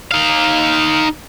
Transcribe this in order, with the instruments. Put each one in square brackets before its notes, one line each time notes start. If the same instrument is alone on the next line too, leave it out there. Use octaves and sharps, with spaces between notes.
[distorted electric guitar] D#4 F5